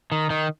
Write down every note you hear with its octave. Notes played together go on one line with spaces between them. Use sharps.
D#3
D#3